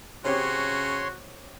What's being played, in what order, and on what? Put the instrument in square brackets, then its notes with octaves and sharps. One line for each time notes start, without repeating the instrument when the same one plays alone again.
[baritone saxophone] C#3 [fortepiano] C4 C#4 G4 [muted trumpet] F#4 [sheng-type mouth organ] C#5 C6